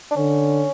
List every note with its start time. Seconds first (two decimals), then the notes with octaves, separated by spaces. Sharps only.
0.11 D4
0.16 D3 C#4